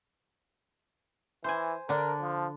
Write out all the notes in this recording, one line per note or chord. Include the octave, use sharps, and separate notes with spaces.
E3 C5 G#5
D3 D4 A#4
F3